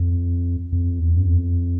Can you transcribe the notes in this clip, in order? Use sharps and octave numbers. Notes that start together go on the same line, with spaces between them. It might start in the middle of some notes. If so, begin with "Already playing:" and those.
Already playing: F2
F2
E2
F#2
F2